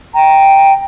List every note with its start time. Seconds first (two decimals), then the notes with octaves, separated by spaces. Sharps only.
0.15 G5 A#5